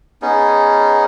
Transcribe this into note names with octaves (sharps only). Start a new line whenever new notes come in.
B3 C#4 D#4 G#4